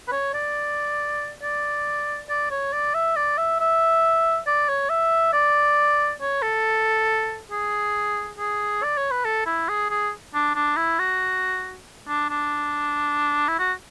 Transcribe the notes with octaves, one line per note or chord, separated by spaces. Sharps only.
B4
C#5
D5
D5
D5
C#5
D5
E5
D5
E5
E5
D5
C#5
E5
D5
C#5
A4
G#4
G#4
D5
C#5
B4
A4
E4
G#4
G#4
D4
D4
E4
F#4
D4
D4
E4
F#4